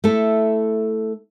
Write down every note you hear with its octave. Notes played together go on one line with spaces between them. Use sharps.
A3 E4 A4